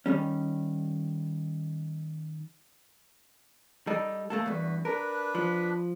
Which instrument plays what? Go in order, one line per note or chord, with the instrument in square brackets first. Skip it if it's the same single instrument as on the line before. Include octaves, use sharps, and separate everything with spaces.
[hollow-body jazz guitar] D#3 G3 C#4
G3 D#4 A4
A3 A#3 A4
[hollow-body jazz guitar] E2 G2 [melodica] F#4 B4
[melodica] D4 B4 [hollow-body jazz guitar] A#4
[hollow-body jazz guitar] F3